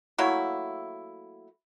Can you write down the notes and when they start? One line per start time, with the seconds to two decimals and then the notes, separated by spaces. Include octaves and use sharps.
0.18 F#3 A3 A#3 E4